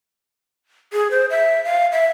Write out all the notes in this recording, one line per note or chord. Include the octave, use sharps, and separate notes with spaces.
G#4
C5
E5
F5
E5